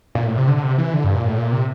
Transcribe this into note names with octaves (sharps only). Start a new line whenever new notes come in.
A#2
A2
C3
D3
C3
E3
D3
G2
A#2
A2
A#2
C3